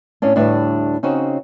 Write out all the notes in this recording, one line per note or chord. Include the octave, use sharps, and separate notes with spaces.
A2 C#4 D4
D2 A2 G3 D4 B4 E5
C#3 C4 C#4 D#4 F#4